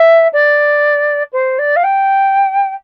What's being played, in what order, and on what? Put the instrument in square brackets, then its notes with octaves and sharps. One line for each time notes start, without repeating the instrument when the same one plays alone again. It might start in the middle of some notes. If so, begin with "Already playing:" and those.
Already playing: [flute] E5
D5
C5
D5
F5
G5